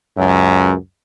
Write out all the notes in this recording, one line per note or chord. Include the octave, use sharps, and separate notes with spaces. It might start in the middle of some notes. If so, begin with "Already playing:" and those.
C#2 F#2